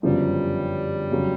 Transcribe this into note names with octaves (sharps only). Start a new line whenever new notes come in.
G1 F#2 C#3 F3 G3
F1 C#3 F#3